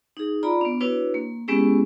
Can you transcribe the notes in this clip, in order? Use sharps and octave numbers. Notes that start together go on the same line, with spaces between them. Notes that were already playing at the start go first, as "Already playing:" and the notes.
D#4 G#4
F4 D5 A#5 B5
B3 D4
D4 E4 F#4 B4 C#5
A#3
G#3 B3 C#4 E4 G4 G#4